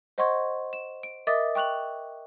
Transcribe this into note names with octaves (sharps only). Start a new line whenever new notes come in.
C5 D#5 F#5 C6 C#6 G#6
E7
D7
A#4 D#5 E5 D6 D#6 A6
G5 C#6 F#6 F7 F#7